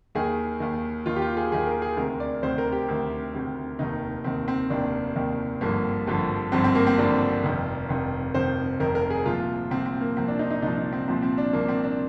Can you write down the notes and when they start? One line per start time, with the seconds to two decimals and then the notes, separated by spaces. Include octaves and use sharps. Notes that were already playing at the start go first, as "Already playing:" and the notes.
0.15 D#2 D#3 G#4
0.60 D#2 D#3
1.06 D#2 D#3 F4
1.16 G4
1.22 F4
1.37 G#4
1.52 D#2 D#3 G#4
1.67 A#4
1.82 G#4
1.97 D2 C3 D#3 A#4
2.20 D5
2.42 D2 C3 D#3 C5
2.58 A#4
2.72 G4
2.88 D2 C3 D#3
3.34 D2 C3 D#3
3.79 F1 D#2 D#3 D#4
4.24 F1 D#2 D#3 C4
4.48 C4
4.70 F1 D#2 D#3 D4
5.16 F1 D#2 D#3
5.61 G#1 G2 D3 F3 A#3
6.07 G#1 G2 D3 F3
6.52 G#1 G2 D3 F3 C4
6.64 C4
6.75 A#3
6.87 C4
6.98 G#1 G2 D3 F3 D4
7.43 F1 F2 D#3
7.89 F1 F2 D#3
8.34 F1 F2 D#3 C5
8.80 F1 F2 D#3 A#4
8.95 A#4
9.10 G#4
9.25 C2 A#2 F3 F4
9.71 C2 A#2 F3 C4
9.86 C4
10.01 A#3
10.17 C2 A#2 F3 C4
10.28 D4
10.39 D#4
10.51 D#4
10.62 C2 A#2 F3 D#4
10.77 D#4
10.93 C4
11.08 C2 A#2 F3 C4
11.23 C4
11.38 D4
11.53 C2 A#2 F3 A#3
11.68 C4
11.84 D4